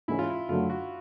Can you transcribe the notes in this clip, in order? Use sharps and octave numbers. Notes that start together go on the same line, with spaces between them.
G#2 E3 G#3 C#4 E4
F4
E4
F#2 D3 F#3 A3 F4
F#4